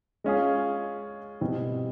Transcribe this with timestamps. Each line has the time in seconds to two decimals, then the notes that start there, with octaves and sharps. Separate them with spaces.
0.24 G#3 C#4 F4 G#4
1.41 B2 G3 C4 E4